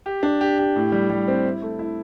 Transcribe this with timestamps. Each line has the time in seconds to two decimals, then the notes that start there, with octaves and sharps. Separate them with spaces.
0.06 G4
0.23 D4
0.41 G4
0.59 G4
0.76 A2
0.92 G3
1.10 G3
1.28 C4
1.45 E4
1.62 A3
1.79 E4